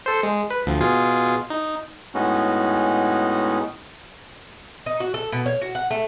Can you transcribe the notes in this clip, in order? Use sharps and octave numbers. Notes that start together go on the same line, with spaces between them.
A4 C5
G#3
B4
D2 F3
B2 F4 G#4
D#4
A2 G#3 B3 C#4 D#4 F#4
D#4
F#4
A4
B2
C#5
F#4
F#5
A3